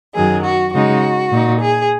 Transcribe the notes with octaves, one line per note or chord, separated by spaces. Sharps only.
F#2 D#3 F#3 G#4
F#4
C#3 G#3 D#4 F#4
A#2 A#3 D#4
G#4